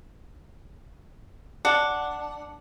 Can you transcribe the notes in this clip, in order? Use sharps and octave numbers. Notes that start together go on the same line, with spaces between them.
D4 F#5